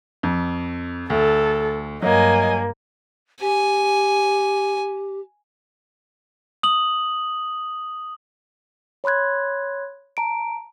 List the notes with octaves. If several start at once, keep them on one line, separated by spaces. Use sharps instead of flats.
F2
D2 A4
G2 F#3 A#3 D#5 G#5
G4 G#5
D#6 F#7
C#5 B5 C6 F#6 G#6
A5 A#5 D7